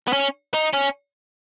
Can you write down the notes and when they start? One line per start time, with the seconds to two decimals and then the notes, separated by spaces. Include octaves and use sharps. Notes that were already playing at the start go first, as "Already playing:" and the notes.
0.08 B3
0.13 C#4
0.54 D#4
0.73 C#4